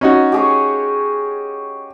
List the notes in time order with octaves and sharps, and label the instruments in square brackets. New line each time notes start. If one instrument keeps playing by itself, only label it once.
[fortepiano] C#4 D#4 F#4
[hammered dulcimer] G4 G#4 C#5